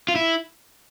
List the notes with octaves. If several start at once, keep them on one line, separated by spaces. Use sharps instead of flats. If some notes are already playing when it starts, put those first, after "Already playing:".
F4
E4